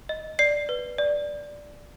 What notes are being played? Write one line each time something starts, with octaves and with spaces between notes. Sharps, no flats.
D#5
D5 C7
B4
D5